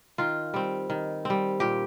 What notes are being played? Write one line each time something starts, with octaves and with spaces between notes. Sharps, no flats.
D#3 F4
G3 C4
D#3
G3 C4
A#2 G4